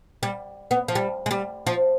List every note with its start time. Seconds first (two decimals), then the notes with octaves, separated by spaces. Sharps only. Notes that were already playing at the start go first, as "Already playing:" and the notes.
0.23 G3
0.71 B3
0.88 F3
0.95 G3
1.26 G#3
1.31 G3
1.67 F3